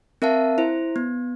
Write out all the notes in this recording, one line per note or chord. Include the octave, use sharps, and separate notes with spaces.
C4 A#4 E5 F5 A5
E4 C5
B3